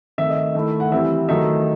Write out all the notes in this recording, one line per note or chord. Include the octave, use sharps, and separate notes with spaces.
D#3 A3 C4 E5
D#5
E5
D#3 A3 E4
F#5
E3 G3 C4 E4 E5
D#3 F#3 A3 D#4 E5